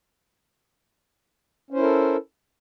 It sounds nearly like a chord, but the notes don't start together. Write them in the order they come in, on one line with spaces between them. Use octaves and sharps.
C#4 C5 E4 A#4 A4